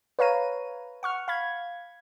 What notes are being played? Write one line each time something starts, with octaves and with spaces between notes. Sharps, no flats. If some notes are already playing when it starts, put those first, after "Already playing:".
B4 C#5 F5 A#5 D#7
F#5 C#6 F6
F5 B5 G#6